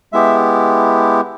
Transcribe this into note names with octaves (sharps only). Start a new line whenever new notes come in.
G#3 B3 E4 G4 E5